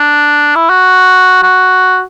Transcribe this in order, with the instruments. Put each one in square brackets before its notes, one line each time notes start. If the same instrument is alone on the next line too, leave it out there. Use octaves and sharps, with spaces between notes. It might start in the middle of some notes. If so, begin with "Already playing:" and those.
Already playing: [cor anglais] D4
E4
F#4
F#4